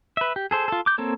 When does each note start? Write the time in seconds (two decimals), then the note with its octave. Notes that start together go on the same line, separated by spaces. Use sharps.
0.17 B4 E5
0.36 G4
0.51 G#4 A4 C5
0.68 F4 A4
0.86 D6 G6
0.98 A#3 C4 A4 C#5